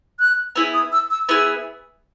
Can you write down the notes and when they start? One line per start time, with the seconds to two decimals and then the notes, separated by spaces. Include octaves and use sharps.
0.19 F#6
0.56 B3 E4 G#4 E6
0.74 D#6
0.92 E6
1.10 E6
1.28 B3 E4 G#4 E6